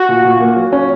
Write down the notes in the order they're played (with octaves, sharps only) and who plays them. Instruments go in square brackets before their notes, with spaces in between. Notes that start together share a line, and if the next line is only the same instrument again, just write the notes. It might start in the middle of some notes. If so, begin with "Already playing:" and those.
Already playing: [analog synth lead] F#4
[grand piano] A#2
A#2
A#3
F#3
C#4